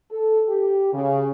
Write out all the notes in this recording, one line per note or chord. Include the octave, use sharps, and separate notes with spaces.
A4
G4
C#3